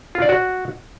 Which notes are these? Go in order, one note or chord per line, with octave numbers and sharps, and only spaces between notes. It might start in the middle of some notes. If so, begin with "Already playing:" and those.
F4
D5
F#4